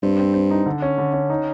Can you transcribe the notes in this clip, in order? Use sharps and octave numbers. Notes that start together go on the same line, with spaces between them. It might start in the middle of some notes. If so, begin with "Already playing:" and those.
G2 C4
C4
C4
D#4
D3
C#4
D3
C#4
D#4